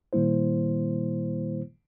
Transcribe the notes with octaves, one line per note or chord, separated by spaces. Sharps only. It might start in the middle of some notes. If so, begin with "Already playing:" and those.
A#2 D#3 G3 A#3 E4 C5